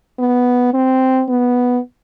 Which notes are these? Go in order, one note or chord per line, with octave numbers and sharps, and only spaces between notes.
B3
C4
B3